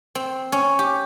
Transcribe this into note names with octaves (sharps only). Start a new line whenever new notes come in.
C4
C#4
G4